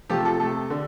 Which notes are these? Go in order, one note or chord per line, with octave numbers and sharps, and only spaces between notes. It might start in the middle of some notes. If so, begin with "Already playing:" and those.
C3 F3 A3 G4
A4
C3 A3 A4
D3